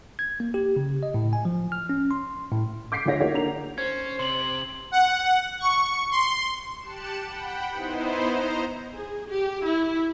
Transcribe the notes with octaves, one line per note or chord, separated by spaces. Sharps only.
G#6
A#3
G4
C#3
D#5
A2
G#5
F3
F6
C#4
C6
A2
D6 G6 B6 C7 D7
D2 F4 C#5 A#6
A#3 D#4 F#4 C#5 F#5
D3 A#3 A#5 F7
C#4 C5 G#6
C3 C6 F#7
F#5
C#6
C6
G4 A5 F#6 C#7 E7
F#5 G5 B5
B3 D#4 E4 C5
C5 D#5 A#5
G#4
G4
E4